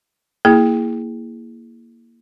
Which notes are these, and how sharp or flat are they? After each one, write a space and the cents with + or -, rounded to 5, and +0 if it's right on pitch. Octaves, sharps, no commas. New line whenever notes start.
A#3 +0 E4 +0 G#4 +0